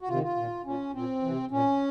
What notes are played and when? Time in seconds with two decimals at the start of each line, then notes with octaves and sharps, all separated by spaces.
0.02 F#4
0.08 C3 D#3 F4
0.23 F4
0.37 A#2
0.65 A#2 C#4
0.94 A#2 C4
1.22 C3 E3
1.51 A#2 C#4